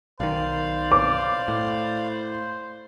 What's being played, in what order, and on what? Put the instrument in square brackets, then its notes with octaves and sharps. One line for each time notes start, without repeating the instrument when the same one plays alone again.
[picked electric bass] B1 D#3 [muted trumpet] C5 [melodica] D5 F5
[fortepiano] D6
[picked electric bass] A2